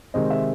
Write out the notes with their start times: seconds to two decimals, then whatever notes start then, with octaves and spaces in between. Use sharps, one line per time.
0.14 C3 D#3 G#3 C4 D#5
0.30 E5